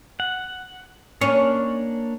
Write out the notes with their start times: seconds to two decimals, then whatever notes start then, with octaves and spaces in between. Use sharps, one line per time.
0.20 F#5
1.21 A#3 C#4 D4 C#5